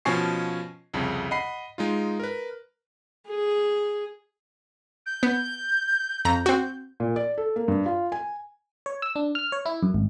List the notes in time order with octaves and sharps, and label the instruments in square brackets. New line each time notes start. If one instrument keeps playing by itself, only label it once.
[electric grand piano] B2 F3 C#4 G#5 C#6 C7
C2 F2 C#3
D#5 F#5 B5 C7
G#3 D#4 F4
A#4 B4
[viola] G#4
[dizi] G6
[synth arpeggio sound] B3
[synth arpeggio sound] F2 A#5 [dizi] G6
[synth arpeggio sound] C4 F#4
[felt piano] A#2
D5
A4
A#3
G2
F4
G#5
[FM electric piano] C#5
E6
D4
F6
C#5
E4
F#2
G#1